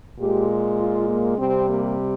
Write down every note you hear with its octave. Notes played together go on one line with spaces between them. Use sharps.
A#2 G#3 G4
F4
A#3
C3 G3 C4
A#3